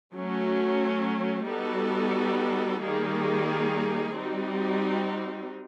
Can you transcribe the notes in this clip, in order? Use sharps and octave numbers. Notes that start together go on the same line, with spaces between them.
F#3 A3 C#4
G3 B3 D#4 F#4 A4
D#3 G3 A#3 D#4 G#4
G3 C4 D#4 F#4